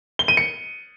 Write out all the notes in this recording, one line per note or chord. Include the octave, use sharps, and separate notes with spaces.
G7
D#7
C#7